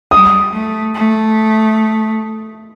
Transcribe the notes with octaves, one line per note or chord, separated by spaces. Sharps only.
G3 D#6
A3
A3